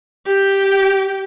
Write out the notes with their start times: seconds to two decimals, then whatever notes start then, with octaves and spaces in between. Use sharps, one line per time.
0.26 G4 G5